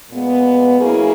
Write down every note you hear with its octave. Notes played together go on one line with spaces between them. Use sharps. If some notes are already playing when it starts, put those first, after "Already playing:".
A#2 G#3 B3
C#3 F#3 A#3 E4 G#4